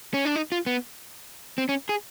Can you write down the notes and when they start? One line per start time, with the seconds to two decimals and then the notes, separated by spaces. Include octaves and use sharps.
0.14 C#4
0.25 D4
0.36 D#4
0.52 F4
0.66 B3
1.58 C4
1.69 C#4
1.89 G#4